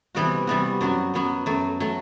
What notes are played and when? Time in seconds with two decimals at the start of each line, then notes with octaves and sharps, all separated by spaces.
0.15 C3 E3 G3 B3 F#4
0.47 C3 E3 G3 B3 F#4
0.81 F#2 F#3 B3 F#4
1.14 F#2 F#3 B3 F#4
1.46 F#2 F#3 A3
1.80 F#3 A3